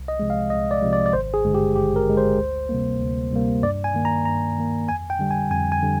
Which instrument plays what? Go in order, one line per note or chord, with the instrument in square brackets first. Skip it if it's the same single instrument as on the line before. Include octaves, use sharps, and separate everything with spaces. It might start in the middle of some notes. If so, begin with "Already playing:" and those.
Already playing: [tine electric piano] C2
D#5
C3 F3 G#3
F5
C2 D#5
D5
C3 F3 G#3
D5
D5
G#1 C5
G#4
G2 D3 G#3
G4
G#1 G4
A#4
G2 D3 G#3
C5
D2
C3 G3 A#3
D2
C3 G3 A#3
G2 D5
G#5
D#3 A#3
A#5
G2 A#5
D#3 A#3
F2 G#5
G5
D3 G3
G#5
F2 G#5
G#5
D3 G3